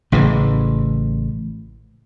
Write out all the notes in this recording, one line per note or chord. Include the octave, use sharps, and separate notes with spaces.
A1 A2 C#3 E3